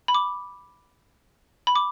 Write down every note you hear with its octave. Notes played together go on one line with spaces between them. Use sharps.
B5
D6
B5
D6